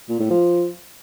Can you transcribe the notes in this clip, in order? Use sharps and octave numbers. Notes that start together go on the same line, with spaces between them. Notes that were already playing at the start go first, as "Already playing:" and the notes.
A#2
A2
F3